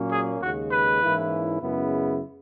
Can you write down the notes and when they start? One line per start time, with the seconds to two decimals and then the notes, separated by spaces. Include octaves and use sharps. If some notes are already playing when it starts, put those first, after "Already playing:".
Already playing: A#2 F#3 A#3 C#4
0.12 G#4
0.42 D#2 C#3 G#3 F#4
0.71 B4
1.02 G#2 E3 A#3 C#4 E4
1.62 F#2 C#3 G#3 B3 E4